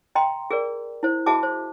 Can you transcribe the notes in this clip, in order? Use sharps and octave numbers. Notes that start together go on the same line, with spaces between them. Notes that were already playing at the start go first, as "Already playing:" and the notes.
D#5 G5 A#5 C6
G#4 A#4 D5
E4 C5
F#4 G#4 D#5 E5 A5 D6
C5